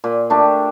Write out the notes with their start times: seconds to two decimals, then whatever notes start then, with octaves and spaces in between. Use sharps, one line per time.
0.04 A#2
0.30 A3 D4 G4